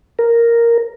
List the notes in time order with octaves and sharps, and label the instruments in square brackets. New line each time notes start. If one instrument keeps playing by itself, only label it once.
[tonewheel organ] A#4